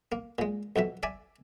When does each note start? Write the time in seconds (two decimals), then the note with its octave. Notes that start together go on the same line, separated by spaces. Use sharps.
0.12 A#3
0.38 A#2 G#3
0.76 B1 F2 B2 E5
1.03 D5 E5 G#5